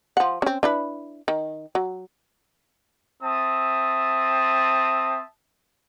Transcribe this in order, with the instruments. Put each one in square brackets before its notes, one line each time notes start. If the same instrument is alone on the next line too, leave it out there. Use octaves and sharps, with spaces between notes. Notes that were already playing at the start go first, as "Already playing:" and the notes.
[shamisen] F3 F#5
C4 C#4
D4 E4 B4
D#3
F#3
[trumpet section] C4 E5 A5 D#6